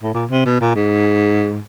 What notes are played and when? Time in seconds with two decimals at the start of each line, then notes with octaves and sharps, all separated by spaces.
0.03 A2
0.14 A#2
0.31 C3
0.46 B2
0.61 A#2
0.76 G#2